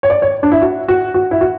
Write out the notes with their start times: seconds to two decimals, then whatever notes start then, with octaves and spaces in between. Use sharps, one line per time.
0.03 C#5
0.10 D5
0.22 C#5
0.43 D4
0.52 E4
0.62 F#4
0.88 F#4
1.14 F#4
1.31 E4
1.41 F#4